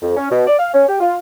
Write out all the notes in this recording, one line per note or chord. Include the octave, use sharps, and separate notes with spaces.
F2
C#4
B2
D5
F5
C#4
G4
F4